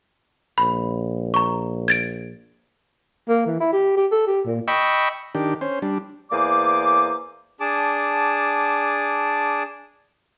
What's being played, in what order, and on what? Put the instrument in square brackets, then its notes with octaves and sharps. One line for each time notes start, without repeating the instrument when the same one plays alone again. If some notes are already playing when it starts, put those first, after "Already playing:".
[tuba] A#1 [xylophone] B5
[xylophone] A#5 C#6
G#6 A6 D7
[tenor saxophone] A#3
E3
E4
G4
G4
A4
G4
A#2
[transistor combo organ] D#5 G5 B5 C#6 E6
D#3 D4 G4
C#4 C5
G3 D4
[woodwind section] E2 A#3 C5 D5 G#5 D6
[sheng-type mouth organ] D4 G#4 A5 D6